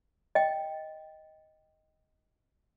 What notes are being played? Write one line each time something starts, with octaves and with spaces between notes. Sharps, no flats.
D#5 G5